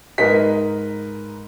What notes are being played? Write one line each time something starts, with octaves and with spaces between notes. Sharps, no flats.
G#2 A#4 B4 D#5 B6